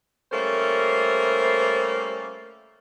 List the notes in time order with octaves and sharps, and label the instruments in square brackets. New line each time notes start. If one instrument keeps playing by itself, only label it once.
[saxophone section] G3 A3 A#3 C#4 C5 E5